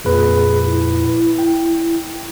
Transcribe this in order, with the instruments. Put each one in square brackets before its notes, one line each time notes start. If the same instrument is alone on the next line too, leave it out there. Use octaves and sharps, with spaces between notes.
[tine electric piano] F2 A#2 B4 [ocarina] G#4
[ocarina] E4
[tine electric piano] G5